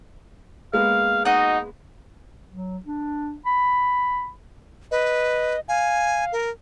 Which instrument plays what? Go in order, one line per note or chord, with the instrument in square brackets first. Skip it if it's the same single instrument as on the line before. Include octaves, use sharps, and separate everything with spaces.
[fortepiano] G#3 A#3 B3 [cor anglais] F5
[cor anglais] D#4 [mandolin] F#4 D#5
[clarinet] F#3
D4
B5
[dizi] B4 [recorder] D#5
[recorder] F5 [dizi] G#5
[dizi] A#4